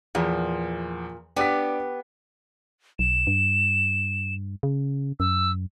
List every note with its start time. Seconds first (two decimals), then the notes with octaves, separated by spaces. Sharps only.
0.15 E2 A#2 F3
1.36 B3 D4 G4 D6 B6
2.99 B1 E7
3.27 G2
4.63 C#3
5.20 F#2 E6